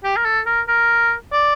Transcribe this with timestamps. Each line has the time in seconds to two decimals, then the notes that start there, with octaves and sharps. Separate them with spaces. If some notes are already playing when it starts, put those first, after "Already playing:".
0.04 G4
0.17 A#4
0.25 A4
0.46 A#4
0.68 A#4
1.33 D5